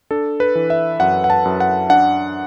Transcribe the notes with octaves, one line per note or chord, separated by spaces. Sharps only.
D4 A4
B4
E3
E5
F#2 F#5
F#5
A5
F#2
F#5
D4 F#5